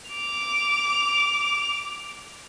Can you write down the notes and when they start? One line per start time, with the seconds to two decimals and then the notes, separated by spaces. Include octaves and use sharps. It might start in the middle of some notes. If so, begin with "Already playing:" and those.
0.10 D6 F7